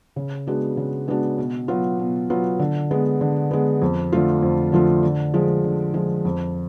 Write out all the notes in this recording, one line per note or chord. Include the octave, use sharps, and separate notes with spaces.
C#3
G#3 B3 D4 F#4
C#3
G#3 B3 D4 F#4
B2
F#3 B3 F4
B2
F#3 B3 F4
D3
G#3 B3
D3
G#3 B3
F2
D3 F3 A3 F4
F2
D3 F3 A3 F4
D3
F3 G#3
D3
F3 G#3
F2